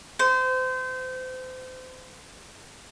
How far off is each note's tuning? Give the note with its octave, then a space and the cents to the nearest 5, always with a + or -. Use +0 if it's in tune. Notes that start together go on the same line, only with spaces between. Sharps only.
C5 -30